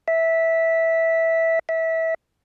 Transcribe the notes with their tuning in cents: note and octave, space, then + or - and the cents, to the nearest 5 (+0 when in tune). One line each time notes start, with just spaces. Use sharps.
E5 -10
E5 -20